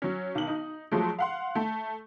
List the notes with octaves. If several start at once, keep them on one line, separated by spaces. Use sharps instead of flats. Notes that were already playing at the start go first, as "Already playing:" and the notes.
F#3 C#4
B1 D#3 F#7
D#4
F3 F#3 G#3 A3
F5 F#5 C6
A3